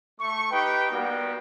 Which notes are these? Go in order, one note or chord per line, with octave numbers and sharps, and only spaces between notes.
A3 C#6
D#4 G4 B4 G5
G3 A#3 B3 F#4 G5